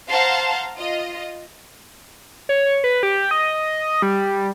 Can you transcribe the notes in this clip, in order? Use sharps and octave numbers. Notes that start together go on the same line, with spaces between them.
C5 F5 F#5 A5 A#5 C6
F4 D#5
C#5
B4
G4
D#5
G3